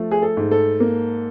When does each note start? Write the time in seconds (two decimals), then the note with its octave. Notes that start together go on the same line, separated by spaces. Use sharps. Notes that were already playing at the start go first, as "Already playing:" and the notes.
Already playing: F3 A3
0.11 G#4
0.22 A4
0.37 G#2
0.51 A4
0.80 A#3